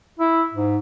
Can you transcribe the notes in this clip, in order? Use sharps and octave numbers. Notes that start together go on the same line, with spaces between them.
E4
G#2